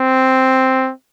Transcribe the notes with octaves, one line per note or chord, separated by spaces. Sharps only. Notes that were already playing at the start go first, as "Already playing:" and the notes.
Already playing: C4